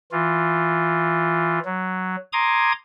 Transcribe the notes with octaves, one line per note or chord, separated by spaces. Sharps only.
E3 F4
F#3
A#5 C6 D6 D#6 G#6